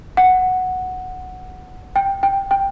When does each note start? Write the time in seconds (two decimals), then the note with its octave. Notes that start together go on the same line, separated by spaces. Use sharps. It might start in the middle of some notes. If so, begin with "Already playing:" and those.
0.17 F#5
1.96 G5
2.23 G5
2.51 G5